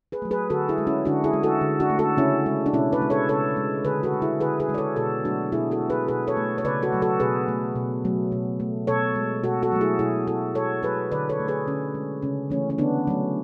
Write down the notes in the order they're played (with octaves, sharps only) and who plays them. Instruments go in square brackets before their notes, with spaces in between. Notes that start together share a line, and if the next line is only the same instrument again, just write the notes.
[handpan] G#4 B4
F#3 A3
G#4 B4
D3 F#4 A4
E4 G#4
G#3
C#4 E4
D3 D4 F#4
E4 G#4
G#3
F#4 A4
D3
D4 F#4
A3
F#4 A4
C#3 C#4 E4
G#3
D4
B2 C#4 E4
B4 D5
G#3
A4 C#5
C#3 A4 C#5
G#3
D3 G#4 B4
F#4 A4
G#3
E4 G#4
D3 G#4 B4
G#4 B4
G#3
D5
A4 C#5
B2 F#4 A4
F#3 A3 D4 F#4
B2 E4 G#4
F#4 A4
G#3
G#4 B4
B2 G#4 B4
A4 C#5
A3
C#5
C#3 B4 D5
F#4 A4
F#3 A3
F#4 A4
B2 G#4 B4
A3
B2
F#3 A3
B2
A3
B2 A4 C#5
G#3
B2 F#4 A4
F#4 A4
F#3 A3
E4 G#4
B2 E4 G#4
A3 F#4 A4
B2 A4 C#5
F#3 A3 G#4 B4
D3 B4 D5
A4 C#5
A3
G#4 B4
D3 C#4
G#3
C#3 C#4
E3 A3 C#4
C#4
D3 B3 D4
F#3 A3 C#4